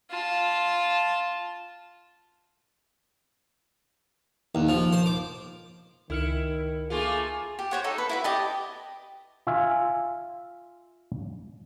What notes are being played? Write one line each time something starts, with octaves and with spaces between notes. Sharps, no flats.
F4 A5
D#2
F3
C5
D6
C#2 D#3 E4 F6 C#7
A3 A#3 F4 G#4
G4
C5 C#5 F#5
D#4 A4
B4
E4 F#4 B4
G4 D#5 A5
F4 E5 G#5